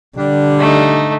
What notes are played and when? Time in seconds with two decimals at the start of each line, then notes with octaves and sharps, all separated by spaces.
0.18 D3 G3 D4
0.60 A3 D#4